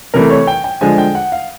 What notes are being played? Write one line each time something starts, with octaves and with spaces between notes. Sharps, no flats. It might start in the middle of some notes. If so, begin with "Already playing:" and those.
C3 E3 A3 A#4
C#5
G5
G5
D3 F3 G#3 G#5
G5
F#5
F5